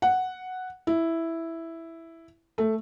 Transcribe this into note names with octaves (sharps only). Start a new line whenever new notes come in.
F#5
E4
A3